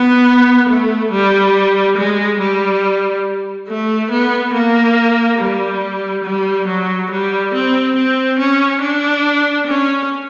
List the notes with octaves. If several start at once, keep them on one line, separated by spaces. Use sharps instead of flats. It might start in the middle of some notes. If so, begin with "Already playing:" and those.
Already playing: B3
A3
G3
G#3
G3
A3
B3
A#3
G3
G3
F#3
G3
C4
C4
C#4
D4
C#4